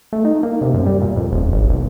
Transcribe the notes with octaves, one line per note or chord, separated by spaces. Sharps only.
A3
D#4
A#3
C3
F#2
G3
A#2
F2
D#1
G#1
B1